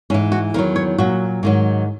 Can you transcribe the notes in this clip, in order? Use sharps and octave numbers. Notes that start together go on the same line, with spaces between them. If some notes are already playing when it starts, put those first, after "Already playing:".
G#2 E3 C#4
F#4
E2 D#3 F#3 A#4
C#5
A#2 F#3 F#4
G#2 D#3 F#3